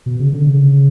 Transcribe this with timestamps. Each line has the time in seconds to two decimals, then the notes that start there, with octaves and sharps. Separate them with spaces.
0.06 B2
0.19 C#3
0.33 D3
0.47 C#3